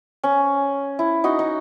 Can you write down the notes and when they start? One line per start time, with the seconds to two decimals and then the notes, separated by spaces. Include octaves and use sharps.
0.23 C#4
0.99 E4
1.24 D#4 F#4
1.39 D#4